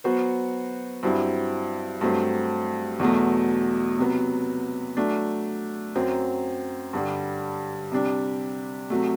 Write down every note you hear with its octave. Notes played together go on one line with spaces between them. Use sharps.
F#3 B3 F#4 C5
G2 F#3 C4 E4
G2 F#3 A3 C4
E2 B2 F#3 A3
C3 F#3 B3
F#3 A3 D4
F#2 F#3 C4
G2 D3 G3
C3 G3 D4
C3 F#3 A3